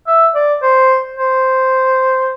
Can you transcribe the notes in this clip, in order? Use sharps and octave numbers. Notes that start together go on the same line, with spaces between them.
E5
D5
C5
C5